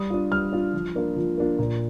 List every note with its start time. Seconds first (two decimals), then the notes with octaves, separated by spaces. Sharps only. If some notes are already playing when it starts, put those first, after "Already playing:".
Already playing: G3 D#6
0.10 D4 F4
0.31 G3 F6
0.53 D4 F4
0.73 F3
0.95 A#3 D4 F4
1.16 F3
1.37 A#3 D4 F4
1.58 A#2